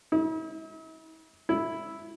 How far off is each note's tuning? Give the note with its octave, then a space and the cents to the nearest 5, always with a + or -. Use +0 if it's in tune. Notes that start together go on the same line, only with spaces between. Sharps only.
E4 -45
E4 -5